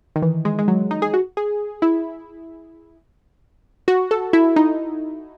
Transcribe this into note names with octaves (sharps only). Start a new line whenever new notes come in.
D#3
E3
G#3
G#3
F#3
D#4
G#4
F#4
G#4
E4
F#4
A4
E4
D#4